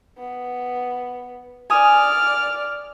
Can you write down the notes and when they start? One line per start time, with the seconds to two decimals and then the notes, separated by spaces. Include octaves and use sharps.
0.18 B3
1.70 D5 G#5 D#6 F6